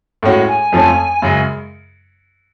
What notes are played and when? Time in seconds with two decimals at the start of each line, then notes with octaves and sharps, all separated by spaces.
0.23 A2 G#3 C#4 F#4
0.47 G#5
0.72 F2 F3 A3 C#4
1.22 F#2 C#3 G#3